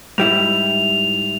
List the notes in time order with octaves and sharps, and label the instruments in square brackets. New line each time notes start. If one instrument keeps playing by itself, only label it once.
[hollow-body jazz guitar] G#2 G3 E4 [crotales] F7